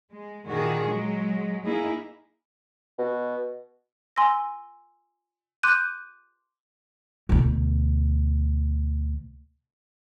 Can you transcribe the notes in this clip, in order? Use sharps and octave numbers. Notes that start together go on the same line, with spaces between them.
G#3
A#2 D3 D#3 F#4 G#4
F#3 G#3
A#3 D#4 E4 G#4
B2
G#5 C6 E6 A#6
C6 D6 F#6 G6 D#7
D2 B2